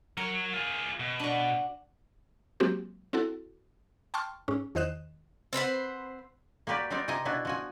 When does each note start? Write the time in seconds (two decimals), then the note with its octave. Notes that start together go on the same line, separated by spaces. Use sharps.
0.17 F#3 A#4 C#5
0.53 F4 G#4
1.00 B2
1.19 D4 F#4
2.60 F#3 G#3 A#3 C4 F#4 G4
3.13 C4 E4 F#4 A4
4.14 G5 A5 C6 C#6 F6
4.48 G#2 C#4
4.75 E2 D#3 C5 D#5 F#6 E7
5.53 C4 B4 C5 F#5
6.67 A#3 F#4 G4 B4 D5
6.90 G3 B3 C4 D#4 A#4 D5
7.08 C3 D#4 D#5 G#5 A#5
7.25 B2 B3 D4 E4 F#4 G#5
7.45 F3 F#4 G#5